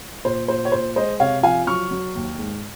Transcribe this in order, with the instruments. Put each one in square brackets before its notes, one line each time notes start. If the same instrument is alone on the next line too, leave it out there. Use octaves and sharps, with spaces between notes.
[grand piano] A#2 C5
A#2 C5
C#5
A#2 C5
G#3 C5 D#5
C3 C#5 F5
F3 F5 G#5
F#3 C#6 F6
F#3
D#2
G#2